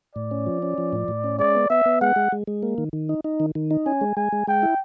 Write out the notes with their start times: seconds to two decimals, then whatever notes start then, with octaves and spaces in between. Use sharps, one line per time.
0.15 A2 D5
0.31 C#4
0.47 F3
0.62 C#4
0.78 F3
0.93 A2
1.08 A2
1.24 C#4
1.39 G#3 D5
1.55 B3
1.70 B3 E5
1.86 B3
2.01 G#3 F#5
2.16 G#3
2.32 G#3
2.47 G#3
2.63 A#3
2.78 D#3
2.93 D#3
3.09 D#4
3.24 D#4
3.40 D#3
3.55 D#3
3.71 D#4
3.86 C#4 G#5
4.01 G#3
4.17 G#3 G#5
4.33 G#3
4.47 G#3 G5
4.63 E4